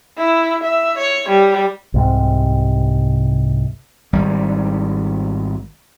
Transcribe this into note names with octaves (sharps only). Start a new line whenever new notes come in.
E4
E5
C#5
G3
C2 G#2 C3
G#1 G3